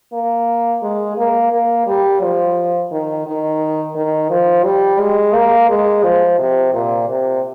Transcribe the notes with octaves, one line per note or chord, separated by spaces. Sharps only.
A#3
G#3
A#3
A#3
G3
F3
D#3
D#3
D#3
F3
G3
G#3
A#3
G#3
F3
C3
A#2
C3